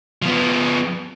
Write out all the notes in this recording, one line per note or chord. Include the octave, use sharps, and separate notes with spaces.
F3 B3